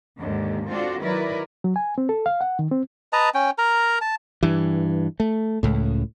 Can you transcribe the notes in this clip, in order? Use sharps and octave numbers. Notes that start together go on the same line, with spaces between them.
D#2 G#2 D3 D#3
C4 D4 F4 F#4 A4 D5
D#3 F#3 E4 A#4 B4 D5
F#3
G#5
C4
A4
F5
F#5
D#3
C4
B4 D#5 A5 A#5
C#4 G5
A#4 A#5
A5
G2 E3
A3
C#2 A2